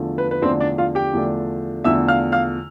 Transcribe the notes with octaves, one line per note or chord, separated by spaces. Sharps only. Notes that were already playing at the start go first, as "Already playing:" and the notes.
Already playing: E2 D3 F3 A3 D4
B4
B4
E2 D3 F3 A3 C4 D4 C5
D4 D5
F4 F5
G4 G5
E2 D3 F3 A3 D4
E2 D3 F3 A3 D4 E5 E6
F5 F6
F5 F6